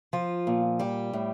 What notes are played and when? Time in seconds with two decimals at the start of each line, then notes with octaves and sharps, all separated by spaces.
0.13 F3 F4
0.47 A#2
0.79 G3 G4
1.13 A2